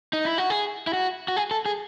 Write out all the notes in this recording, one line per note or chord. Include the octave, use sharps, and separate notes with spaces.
D#4
E4
F#4
G#4
E4
F#4
F#4
G#4
A4
G#4